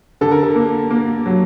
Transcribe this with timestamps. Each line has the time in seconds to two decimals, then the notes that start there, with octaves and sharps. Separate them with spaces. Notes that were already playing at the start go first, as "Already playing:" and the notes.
0.21 D3 A4
0.31 A#4
0.43 A4
0.56 A#3
0.90 A#3
1.26 F#3